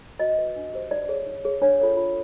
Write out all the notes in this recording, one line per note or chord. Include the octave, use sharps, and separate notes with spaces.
F#4 D#5
B4
D4
G4 C5
D#4 D5
G#4 C#5
D#4
G#4 C#5
D4 C#5
F4 A4 C#5
F4